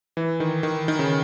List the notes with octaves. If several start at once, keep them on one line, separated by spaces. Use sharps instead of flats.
E3
D#3
D#3
D#3
C#3